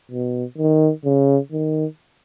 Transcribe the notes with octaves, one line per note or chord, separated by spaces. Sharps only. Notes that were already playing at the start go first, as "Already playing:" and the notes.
B2
D#3
C#3
D#3